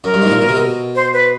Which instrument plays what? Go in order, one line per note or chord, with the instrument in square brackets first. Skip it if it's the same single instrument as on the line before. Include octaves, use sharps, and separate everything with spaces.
[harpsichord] F#2 [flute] A#4
[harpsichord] G2
G#2
A2
A#2
B2
C3
B2
[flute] C5
B4